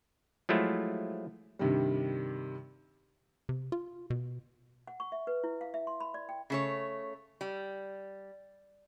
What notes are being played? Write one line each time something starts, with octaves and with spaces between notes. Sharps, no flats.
F3 F#3 G#3 A3 E4 F4
G2 C3 D#3 G3
C3
F4
B2
F#5
C#6
E5
B4
E4
F5
E5
C6
B5
D5
G5
C#3 A3 C#5
G3